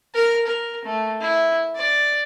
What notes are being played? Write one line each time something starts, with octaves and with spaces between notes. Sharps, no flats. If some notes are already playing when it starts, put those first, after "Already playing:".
A#4
A#4
A3
E4
D5